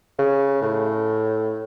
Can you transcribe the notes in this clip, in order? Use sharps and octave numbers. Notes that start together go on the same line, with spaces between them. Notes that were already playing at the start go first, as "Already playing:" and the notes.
C#3
A2